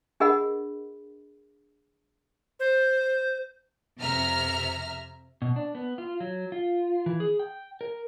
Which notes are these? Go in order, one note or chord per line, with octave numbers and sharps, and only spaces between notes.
D4 G#4 A#4 D#5 F#5 B5
C5
F2 C3 E5 A#5 F6
B2
D4
B3
F4
F#3
F4
E3
G#4
G5
A#4